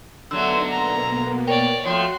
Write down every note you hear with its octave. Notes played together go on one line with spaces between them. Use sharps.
D3 F#3 A3 B3 D4 D#4 E6
B2 A#3 B3 A#5
A#4 C#5 D5 G5
F3 A3 F#4 C#5 F#5 G5 C6 F#6